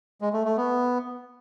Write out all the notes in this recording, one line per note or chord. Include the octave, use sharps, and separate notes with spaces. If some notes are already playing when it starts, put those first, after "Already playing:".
G#3
A3
A3
B3